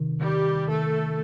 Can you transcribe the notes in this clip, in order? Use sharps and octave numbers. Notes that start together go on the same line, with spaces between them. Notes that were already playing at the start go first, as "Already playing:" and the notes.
Already playing: C3 D#3
D#3 G3 G4
D#3 A3 A4